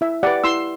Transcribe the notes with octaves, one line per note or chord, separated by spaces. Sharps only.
E4 E5
G4 B4 D5 F#5
E4 C6 E6